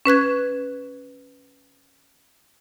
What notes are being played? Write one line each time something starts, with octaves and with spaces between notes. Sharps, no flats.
C#4 B4 F#6 G#6